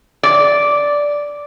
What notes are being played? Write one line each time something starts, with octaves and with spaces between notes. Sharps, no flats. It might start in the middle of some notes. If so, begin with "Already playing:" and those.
D5